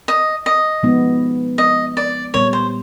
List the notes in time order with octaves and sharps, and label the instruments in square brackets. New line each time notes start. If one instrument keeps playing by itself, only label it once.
[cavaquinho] D#5
D#5
[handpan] F3 G#3 B3 D#4
[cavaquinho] D#5
D5
[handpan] A#2 G3 B3 [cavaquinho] C#5
[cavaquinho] C5